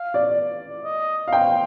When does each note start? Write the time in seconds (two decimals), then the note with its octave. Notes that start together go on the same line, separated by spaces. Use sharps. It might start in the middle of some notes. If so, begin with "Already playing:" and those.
Already playing: F5
0.14 D5
0.85 D#5
1.28 F5
1.32 C5 G5